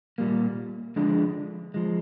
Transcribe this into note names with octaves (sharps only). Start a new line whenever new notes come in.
A#2 G3 A#3
D3 F3 G#3 D4
F3 G#3